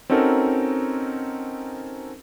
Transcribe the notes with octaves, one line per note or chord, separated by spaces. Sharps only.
C4 C#4 D#4 F#4 A4 A#4